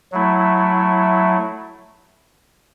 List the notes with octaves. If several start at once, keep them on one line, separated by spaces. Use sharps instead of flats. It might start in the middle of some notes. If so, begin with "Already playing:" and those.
F#3 A3 E4